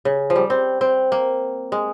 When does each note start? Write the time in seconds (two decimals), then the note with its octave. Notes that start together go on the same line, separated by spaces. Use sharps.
0.05 C#3
0.30 F3
0.36 G3
0.50 C4
0.81 C4
1.12 A#3
1.72 G#3